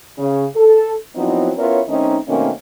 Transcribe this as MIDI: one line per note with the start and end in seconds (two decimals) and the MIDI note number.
0.18 0.44 49
0.56 0.92 69
1.16 1.51 53
1.16 1.51 54
1.16 1.51 59
1.16 1.51 60
1.16 1.51 63
1.16 1.51 64
1.57 1.80 59
1.57 1.80 61
1.57 1.80 64
1.57 1.80 65
1.57 1.80 70
1.57 1.80 73
1.88 2.17 51
1.88 2.17 57
1.88 2.17 60
1.88 2.17 61
1.88 2.17 63
2.27 2.50 47
2.27 2.50 51
2.27 2.50 57
2.27 2.50 58
2.27 2.50 60
2.27 2.50 61